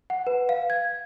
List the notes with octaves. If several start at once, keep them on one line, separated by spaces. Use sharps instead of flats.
F#5
B4
F5
G#6